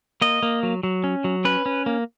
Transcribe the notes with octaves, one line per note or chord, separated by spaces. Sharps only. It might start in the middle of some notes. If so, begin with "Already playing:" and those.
A#3 D#5
A#3
F#3
F#3
C#4
F#3
C#4 B4
C#4
A#3